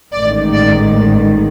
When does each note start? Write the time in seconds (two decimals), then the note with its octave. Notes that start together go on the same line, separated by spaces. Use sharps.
0.12 A1 G#2 D#3 D5
0.53 D5